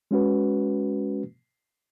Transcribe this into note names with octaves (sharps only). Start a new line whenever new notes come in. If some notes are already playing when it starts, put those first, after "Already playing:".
G#3 C#4 F#4 B4